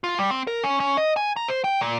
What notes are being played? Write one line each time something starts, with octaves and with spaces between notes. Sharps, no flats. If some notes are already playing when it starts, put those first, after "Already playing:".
F4
G3
C4
A#4
C#4
C#4
D#5
G#5
A#5
C5
G5
A#2